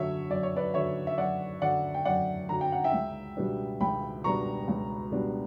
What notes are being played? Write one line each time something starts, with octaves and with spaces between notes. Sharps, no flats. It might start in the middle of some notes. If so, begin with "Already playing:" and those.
Already playing: F#2 D3 F#3 C#5 E5
F#2 D5
C#5
B4 D5
D3 F#3 C#5 E5
E5
F#2 D5 F#5
D3 F#3 D5 F#5
G5
F#2 D5 F#5
D3 F#3 A#5
G5
F#5
E5 G5
C#2
B2 G3 B3 D4
C#2 G5 B5
B2 G3 B3 D4 A#5 C#6
C#2
B2 G3 B3 D4